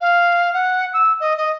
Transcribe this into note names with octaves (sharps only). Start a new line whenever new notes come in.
F5
F#5
E6
D#5
D#5